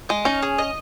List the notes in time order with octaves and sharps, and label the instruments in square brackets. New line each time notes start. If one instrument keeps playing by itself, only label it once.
[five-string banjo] G#3 [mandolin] D#5
[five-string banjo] C#4 [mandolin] D#4
[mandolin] G#4
D#5